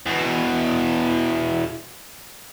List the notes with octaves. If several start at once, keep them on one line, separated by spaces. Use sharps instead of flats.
E2 B2